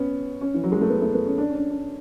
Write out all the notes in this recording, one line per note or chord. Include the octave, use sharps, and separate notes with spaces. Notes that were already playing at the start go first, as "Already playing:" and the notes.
Already playing: B3 C#4
C#4
E3
F#3
G#3
A3
B3
A3
B3
C#4
D4
C#4
D4
D4